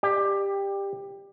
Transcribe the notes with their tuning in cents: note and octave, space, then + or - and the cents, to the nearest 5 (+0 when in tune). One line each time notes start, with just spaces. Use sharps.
G4 +15 D5 +30